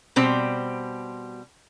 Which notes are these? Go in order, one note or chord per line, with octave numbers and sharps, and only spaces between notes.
B2 G3 C4 C5